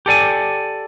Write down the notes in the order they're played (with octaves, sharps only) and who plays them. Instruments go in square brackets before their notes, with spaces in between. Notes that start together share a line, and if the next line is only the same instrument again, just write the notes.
[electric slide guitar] G4 A4 D5 G#5